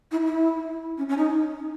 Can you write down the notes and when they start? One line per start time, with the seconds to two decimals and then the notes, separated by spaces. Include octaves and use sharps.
0.11 E4
0.26 E4
0.98 C#4
1.09 C#4
1.17 D#4